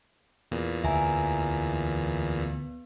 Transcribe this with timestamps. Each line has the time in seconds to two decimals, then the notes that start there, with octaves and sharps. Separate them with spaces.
0.51 E2 A#2
0.84 D2 E3 E5 G#5 A#5
2.40 B3